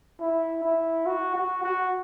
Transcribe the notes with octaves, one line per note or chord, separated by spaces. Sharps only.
E4
E4
F#4
F#4
F#4